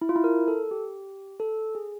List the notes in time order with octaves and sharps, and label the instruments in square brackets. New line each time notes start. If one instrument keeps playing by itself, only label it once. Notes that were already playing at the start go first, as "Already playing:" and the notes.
[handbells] E4
F4
E4
A#4
A4
G4
A4
G#4